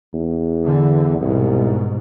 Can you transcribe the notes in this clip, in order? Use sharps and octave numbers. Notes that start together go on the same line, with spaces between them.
E2
D3 E3
C2 G#2 B2